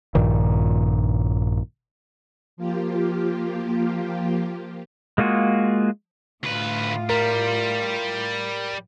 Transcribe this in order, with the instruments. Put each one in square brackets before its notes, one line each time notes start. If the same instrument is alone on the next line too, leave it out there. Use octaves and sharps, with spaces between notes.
[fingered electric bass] A#1 G2 A#2 D#3
[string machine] F3 A#3 F4 G4
[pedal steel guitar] G#3 A#3 F4 F#4 G#4
[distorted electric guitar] D2 B4 [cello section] A2 F4
[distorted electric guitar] G3 [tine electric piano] A#4